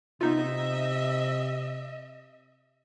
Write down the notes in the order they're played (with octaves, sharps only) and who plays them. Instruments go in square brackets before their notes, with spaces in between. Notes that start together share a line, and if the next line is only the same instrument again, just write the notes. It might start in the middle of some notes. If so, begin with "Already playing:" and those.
[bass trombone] C3 [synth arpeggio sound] B3 D#4 F4 [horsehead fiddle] D#5 E5